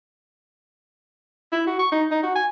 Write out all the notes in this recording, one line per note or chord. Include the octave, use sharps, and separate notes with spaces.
E4
F#4
C#6
D#4
D#4
F#4
G#5